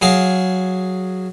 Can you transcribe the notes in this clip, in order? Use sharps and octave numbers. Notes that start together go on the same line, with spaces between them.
F#3 G#4 F5